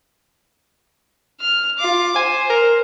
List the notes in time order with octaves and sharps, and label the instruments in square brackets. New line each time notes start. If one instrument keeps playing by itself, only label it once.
[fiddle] F6
F4 D6
[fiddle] C5 [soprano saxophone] G#5
[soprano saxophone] A#4